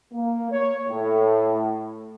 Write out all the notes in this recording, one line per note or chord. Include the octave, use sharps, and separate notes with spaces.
A#3
C#5
A2